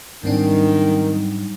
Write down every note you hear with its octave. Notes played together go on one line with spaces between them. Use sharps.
G#2 D#3 F#3 G3 C4 D4 D#4